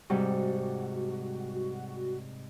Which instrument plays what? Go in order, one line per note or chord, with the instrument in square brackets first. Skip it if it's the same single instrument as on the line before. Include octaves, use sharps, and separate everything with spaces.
[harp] G#2 C3 G3 [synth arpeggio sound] F#4